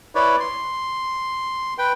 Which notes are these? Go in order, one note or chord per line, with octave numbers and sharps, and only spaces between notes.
E4 B4 C#5 D5
C6
B4 G5